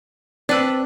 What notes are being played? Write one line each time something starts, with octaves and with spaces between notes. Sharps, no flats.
C4 D4 B4 D5 E6